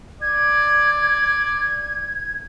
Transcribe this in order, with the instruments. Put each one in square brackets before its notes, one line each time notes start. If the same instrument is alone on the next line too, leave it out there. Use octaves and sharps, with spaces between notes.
[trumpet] D5 [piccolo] G#6